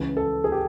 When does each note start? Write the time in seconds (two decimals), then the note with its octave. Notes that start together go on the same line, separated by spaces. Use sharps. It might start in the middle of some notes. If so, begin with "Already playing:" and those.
Already playing: C#2 C#3 E3
0.17 A4
0.44 G#4
0.52 G4